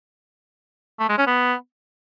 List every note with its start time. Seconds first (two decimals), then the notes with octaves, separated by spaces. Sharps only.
1.00 A3
1.09 G#3
1.18 C#4
1.27 B3